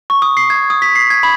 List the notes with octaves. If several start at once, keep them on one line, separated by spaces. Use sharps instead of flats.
C#6
D#6
C7
G#6
D#6
B6
C7
G#6
B5